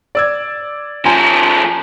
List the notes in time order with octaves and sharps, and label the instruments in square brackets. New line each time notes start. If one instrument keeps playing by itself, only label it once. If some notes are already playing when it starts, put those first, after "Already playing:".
[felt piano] D5 E6 G#6
[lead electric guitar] F3 C#4 [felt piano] G#5 A#5 C6